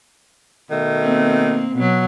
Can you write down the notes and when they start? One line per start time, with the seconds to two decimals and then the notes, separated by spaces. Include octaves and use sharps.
0.71 B2 D#3 A3
1.02 A#3 C4
1.75 B2 F#3